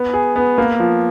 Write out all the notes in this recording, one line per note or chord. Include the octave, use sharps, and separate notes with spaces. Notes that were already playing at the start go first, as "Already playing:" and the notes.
Already playing: B3
G#4
B3
A#3
F3